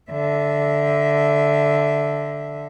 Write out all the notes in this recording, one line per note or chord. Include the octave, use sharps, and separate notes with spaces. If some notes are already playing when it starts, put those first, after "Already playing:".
D3 E5